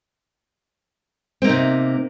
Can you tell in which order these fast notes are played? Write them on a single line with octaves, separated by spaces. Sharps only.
C4 A#3 D#4 C3